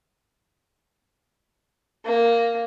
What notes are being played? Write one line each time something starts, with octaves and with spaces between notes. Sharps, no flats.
A#3